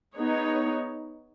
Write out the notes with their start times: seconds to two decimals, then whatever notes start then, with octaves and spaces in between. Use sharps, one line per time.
0.16 B3 D#4 G#4 C#5